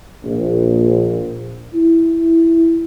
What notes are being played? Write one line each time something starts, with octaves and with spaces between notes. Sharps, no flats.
A#1
E4